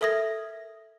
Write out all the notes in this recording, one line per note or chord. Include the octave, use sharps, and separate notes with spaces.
A4 A#4 E5 D#6 G#6 A#6